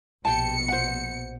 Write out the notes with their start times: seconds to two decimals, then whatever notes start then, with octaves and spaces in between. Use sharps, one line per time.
0.25 A#1 B2 G4 G5 A5 C#7
0.68 C5 F#5